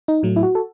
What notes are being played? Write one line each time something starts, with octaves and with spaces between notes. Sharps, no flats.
D#4
A2 F#3 A3
E4
F#4
A4